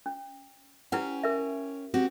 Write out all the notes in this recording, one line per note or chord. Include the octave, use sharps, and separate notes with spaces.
C#4
C#4 E4 G4 B4 F#5
A#4 E5
C4 F#4 G4